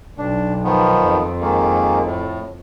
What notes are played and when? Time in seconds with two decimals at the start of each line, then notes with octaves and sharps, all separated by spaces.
0.18 B1 D4
0.64 D#3 F3 B3
1.03 F2
1.41 D#3 G#3 A#3
2.06 A2